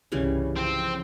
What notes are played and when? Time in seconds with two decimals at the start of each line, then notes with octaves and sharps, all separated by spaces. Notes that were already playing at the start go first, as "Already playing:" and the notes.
0.12 C2 G2 C#3 E3 G3 C#4
0.56 F3 C4